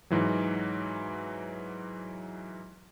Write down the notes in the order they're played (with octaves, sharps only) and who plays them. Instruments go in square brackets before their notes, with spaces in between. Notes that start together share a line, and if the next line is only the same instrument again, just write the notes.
[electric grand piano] G#2 E3 F#3